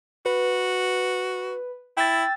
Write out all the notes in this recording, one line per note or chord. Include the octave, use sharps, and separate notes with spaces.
F#4 B4
E4 G5 E6 A6